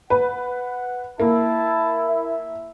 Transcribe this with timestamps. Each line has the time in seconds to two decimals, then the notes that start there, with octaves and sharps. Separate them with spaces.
0.10 B4 F#5
1.20 A#3 E4 A5
2.08 E5